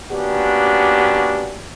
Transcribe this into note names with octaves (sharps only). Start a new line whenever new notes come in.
A#3 B3 C#4 D4 F#4 G4